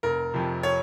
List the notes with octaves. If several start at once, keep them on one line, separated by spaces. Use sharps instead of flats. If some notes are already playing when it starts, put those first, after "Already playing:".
F1 A#4
F2 C3 F3
C#5